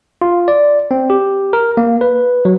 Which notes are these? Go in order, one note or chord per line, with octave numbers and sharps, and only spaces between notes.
F4
D5
C4
G4
A#4
A#3
B4
F#3